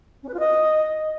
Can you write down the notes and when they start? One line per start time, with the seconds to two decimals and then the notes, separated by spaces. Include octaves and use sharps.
0.23 C#4
0.28 B4
0.34 F4
0.39 D#5